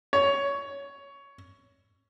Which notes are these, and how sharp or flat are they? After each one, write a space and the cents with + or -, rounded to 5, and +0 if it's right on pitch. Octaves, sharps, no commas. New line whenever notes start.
C#5 +10